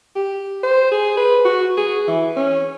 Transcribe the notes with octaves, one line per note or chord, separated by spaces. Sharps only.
G4
C5
G#4
B4
F#4
G#4
E3
C#4